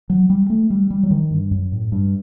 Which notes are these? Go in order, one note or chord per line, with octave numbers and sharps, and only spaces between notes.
F#3
G3
A3
G3
G3
F#3
D#3
G2
F#2
A2
G2